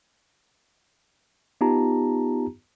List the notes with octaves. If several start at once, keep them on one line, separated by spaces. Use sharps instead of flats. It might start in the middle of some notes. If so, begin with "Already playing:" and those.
B3 D#4 F4 G4 A5 A#5